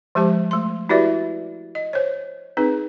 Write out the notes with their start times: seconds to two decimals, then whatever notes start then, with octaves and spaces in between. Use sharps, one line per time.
0.15 F3 G#3 G4 C5 A5
0.51 A3 C6
0.89 E4 F#4 G4 B4 D5 E5
1.75 D#5
1.93 C5 C#5
2.57 C4 D#4 G#4 B4